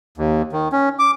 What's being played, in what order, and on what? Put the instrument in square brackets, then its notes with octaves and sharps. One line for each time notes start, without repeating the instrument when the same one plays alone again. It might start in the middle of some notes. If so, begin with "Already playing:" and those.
[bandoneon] D#2
D#3
C#4
D6